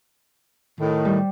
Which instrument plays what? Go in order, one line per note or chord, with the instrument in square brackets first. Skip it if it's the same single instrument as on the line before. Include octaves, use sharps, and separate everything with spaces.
[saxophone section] A2 D#3
[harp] G3